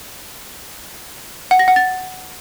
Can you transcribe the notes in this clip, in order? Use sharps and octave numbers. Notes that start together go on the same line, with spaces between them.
F#5
A#6
F#5
A6